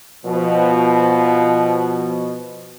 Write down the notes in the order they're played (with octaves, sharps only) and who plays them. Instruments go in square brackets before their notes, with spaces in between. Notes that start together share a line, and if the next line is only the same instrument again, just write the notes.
[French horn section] B2 F3